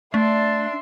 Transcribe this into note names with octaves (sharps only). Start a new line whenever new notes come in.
A3 D4 E5 C6